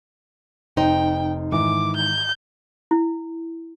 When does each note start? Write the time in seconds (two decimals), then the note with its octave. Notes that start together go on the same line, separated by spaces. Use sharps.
0.77 F1 D#4 C5 G5
1.52 G#2 D#3 E3 D6
1.96 G6
2.91 E4